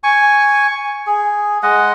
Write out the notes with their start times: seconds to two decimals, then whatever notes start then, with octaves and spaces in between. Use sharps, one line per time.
0.04 G#5 C#6
1.07 G#4
1.63 G#3 D#5 F#5